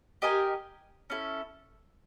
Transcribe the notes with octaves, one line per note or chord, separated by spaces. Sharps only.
G4 A#4 D#5 G#5
C#4 E4 A4